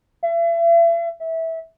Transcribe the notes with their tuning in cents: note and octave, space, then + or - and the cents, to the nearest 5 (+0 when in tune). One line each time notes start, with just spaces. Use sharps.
E5 +40
E5 -15